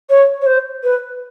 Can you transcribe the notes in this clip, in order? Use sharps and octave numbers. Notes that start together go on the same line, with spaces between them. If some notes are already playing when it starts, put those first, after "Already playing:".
C#5
C#5
C5
B4